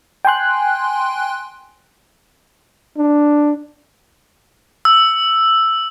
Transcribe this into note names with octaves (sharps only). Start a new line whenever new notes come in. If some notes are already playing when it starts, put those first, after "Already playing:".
G5 G#5 C6 F#6
D4
E6